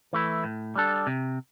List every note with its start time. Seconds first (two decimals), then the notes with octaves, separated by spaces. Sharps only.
0.13 E3 A3 E4
0.44 A2
0.76 G3 D4 A4
1.07 C3